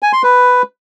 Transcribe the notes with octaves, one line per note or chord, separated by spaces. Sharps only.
G#5
C6
B4